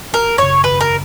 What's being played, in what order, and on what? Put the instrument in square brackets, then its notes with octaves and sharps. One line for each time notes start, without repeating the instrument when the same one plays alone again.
[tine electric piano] G#1 [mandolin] A#4
[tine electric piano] F#2 C#3 [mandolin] C#5
[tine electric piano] G#1 [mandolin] B4
[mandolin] A#4